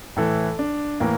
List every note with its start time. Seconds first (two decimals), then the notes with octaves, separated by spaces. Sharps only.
0.16 A2 E3 A4
0.59 D4
1.00 A2 E3 A#3